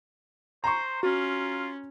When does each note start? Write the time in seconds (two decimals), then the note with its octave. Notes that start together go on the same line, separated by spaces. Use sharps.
0.64 C5 A#5 C6 C#6
1.03 C#4 F4 F#4